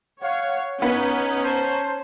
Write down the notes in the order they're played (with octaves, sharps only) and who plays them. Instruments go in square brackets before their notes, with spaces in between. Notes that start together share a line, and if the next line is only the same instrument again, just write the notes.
[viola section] C#5 [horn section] F5 F#5
[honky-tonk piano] B3 [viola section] C#4 [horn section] D#4
[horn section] C5 A5 A#5